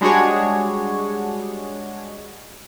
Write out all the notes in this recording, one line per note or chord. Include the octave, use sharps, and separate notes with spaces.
G3 G#3 D4 F#4 G#4 C#5